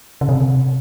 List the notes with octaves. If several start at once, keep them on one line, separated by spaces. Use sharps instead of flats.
C#3
C3